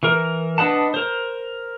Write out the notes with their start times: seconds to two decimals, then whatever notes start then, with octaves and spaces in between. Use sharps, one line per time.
0.03 E3 A#4
0.58 D4 B4 D#5 F#5 A5
0.94 A#4 C5